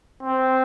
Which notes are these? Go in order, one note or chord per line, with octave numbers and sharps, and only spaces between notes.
C4